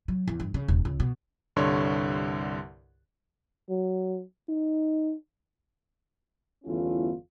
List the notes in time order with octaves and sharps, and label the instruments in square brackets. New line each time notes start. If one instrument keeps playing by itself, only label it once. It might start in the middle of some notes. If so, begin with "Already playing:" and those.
[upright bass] F#3
E2
G2
C#3
D#1
C#2
B2
[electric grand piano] C2 G2 D3 C#5 C6
[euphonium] F#3
D#4
[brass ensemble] G1 E2 A3 C#4 E4 F4